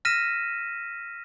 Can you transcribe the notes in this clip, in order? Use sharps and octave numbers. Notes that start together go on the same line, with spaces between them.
E6 F6 A#6 B6 D#7 E7